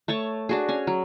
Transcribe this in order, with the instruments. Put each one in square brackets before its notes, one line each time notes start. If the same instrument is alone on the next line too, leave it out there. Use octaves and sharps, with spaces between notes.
[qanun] A3 C#5 A5 C#6
D4 F#4 G#4
C#4 G#5
F#3